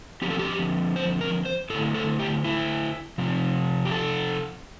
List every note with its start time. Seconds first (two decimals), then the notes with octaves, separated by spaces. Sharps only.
0.22 D3 F3 C4 G4
0.31 A4
0.39 G4
0.96 C5
1.21 A#4
1.45 C5
1.70 D3 A3 E4 A4
1.94 A4
2.19 G4
2.44 E4
3.18 C3 F3 C4
3.85 G4
3.92 A4